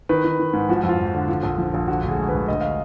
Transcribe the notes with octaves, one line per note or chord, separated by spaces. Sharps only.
D#3 B4
D#3
D#3
G#2
F3 F#4
F2
F4
F2
D3
F3
A#1
F3
A#1
D3 F#4
D2
G#4
G#3
D2 B4
D2 D#5
F5